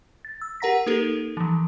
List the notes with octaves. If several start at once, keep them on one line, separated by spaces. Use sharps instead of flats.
A6
E6
G4 A#4 F#5 A#5 A#6 B6
A#3 D#4 G4 A4 A#4
E3 F3